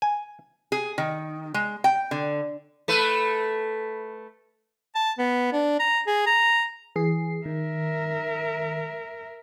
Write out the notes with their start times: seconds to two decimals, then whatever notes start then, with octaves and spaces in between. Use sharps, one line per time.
0.02 G#5
0.72 G#4
0.98 D#3
1.54 G#3
1.84 G5
2.11 D3
2.88 A3 B4
4.95 A5
5.18 B3
5.52 D4
5.79 A#5
6.07 G#4
6.26 A#5
6.96 E3 G#4 C7
7.46 D#3 A#4 E5